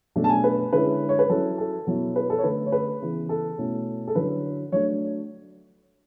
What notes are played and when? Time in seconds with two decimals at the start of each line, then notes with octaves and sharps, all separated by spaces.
0.16 B2 F#3 A3 D4
0.24 A5
0.29 G#5
0.44 B4
0.73 D3 G#3 C#4 E4 B4
1.09 C#5
1.19 B4
1.29 F#3 C#4 E4 A4
1.58 A4
1.87 B2 F#3 B3 E4
2.16 B4
2.30 A4
2.38 C#5
2.43 D3 A3 D4 B4
2.66 C#5
2.72 B4
3.02 C#3 E3 B3
3.29 A4
3.58 B2 A3 C#4 E4
4.07 A4
4.15 D3 F#3 C#4 E4 B4
4.72 F#3 A3 D4 C#5